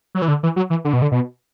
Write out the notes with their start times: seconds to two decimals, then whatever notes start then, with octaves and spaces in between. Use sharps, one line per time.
0.15 F#3
0.22 E3
0.28 D3
0.43 E3
0.56 F#3
0.70 E3
0.85 D3
0.93 B2
1.02 D3
1.12 B2